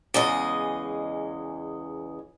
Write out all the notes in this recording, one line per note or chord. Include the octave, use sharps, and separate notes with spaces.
E2 C#3 G#3 D#5